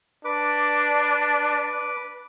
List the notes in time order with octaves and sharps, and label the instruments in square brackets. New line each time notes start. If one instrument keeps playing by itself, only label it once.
[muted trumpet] D4 [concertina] B4 D6